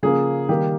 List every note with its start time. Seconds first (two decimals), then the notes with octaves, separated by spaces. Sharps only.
0.03 C#3 F3 A#3 G#4
0.49 D#3 G3 A#3 G4